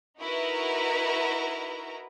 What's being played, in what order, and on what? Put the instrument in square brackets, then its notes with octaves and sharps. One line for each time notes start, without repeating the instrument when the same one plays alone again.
[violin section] D#4 E4 F#4 A#4 B4 A#5